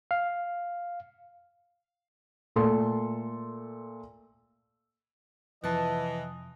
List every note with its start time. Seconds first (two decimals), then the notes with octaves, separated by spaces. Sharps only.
0.11 F5
2.56 A#2 A3 A4 C6
5.64 F2 C3 E3 F3 D#5 F#5 A5